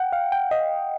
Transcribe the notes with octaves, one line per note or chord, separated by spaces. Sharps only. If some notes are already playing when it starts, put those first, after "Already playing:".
Already playing: F#5 G5
F5
G5
D#5